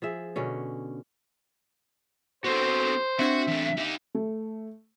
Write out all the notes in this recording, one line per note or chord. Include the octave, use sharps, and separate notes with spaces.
F3 G#4 E5
B2 D3 C#4
B3 C4 F#4 A4 C5
C4 D4 F#4 E5 C#7
E2 A3
D#4 G4
A3